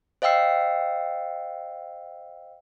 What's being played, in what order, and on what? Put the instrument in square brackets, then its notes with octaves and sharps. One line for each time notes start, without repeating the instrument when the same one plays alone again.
[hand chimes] C5 D#5 F5 G5 E6 C7